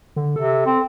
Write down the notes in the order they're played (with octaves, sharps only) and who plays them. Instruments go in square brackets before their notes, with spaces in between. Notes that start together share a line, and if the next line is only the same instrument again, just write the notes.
[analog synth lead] D3
[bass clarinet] C3 [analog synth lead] A4
[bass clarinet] C4